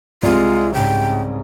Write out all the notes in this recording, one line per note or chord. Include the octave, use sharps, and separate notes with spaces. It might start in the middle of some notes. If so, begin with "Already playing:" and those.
C2 G#3 F4 D5
G#2 C#3 G5